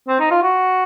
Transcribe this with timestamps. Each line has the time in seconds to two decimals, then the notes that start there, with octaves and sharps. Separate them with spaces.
0.08 C4
0.20 D#4
0.31 F4
0.42 F#4